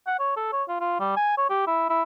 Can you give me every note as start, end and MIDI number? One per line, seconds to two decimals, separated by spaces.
0.07 0.15 78
0.20 0.34 73
0.37 0.52 69
0.53 0.63 73
0.69 0.76 65
0.81 1.00 65
1.00 1.12 55
1.16 1.33 80
1.37 1.49 73
1.50 1.62 67
1.67 1.89 64
1.90 2.03 64